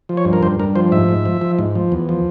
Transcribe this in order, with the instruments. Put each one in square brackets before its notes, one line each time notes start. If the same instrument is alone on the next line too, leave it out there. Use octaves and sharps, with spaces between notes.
[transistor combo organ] F3
C#5
G2
A#4
G2 C5
G2 A#4
F3 C5
G#2 E5
G#2
F3
F3
G#2
F3
E2
F3